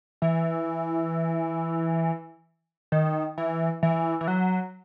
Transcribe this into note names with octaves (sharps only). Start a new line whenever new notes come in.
E3
D#3
E3
E3
E3
F#3